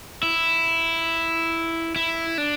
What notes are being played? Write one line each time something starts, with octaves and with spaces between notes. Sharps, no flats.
E4
E4
D4